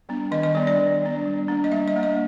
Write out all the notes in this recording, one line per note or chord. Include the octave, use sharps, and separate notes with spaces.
G3 B3 D4
D#3 D#5
D#5
G3 B3 D4 D5
D5
D#3
G3 B3 D4
G3
A#3 D4
D#5
G3 E5
D#5
A#3 D4
D#5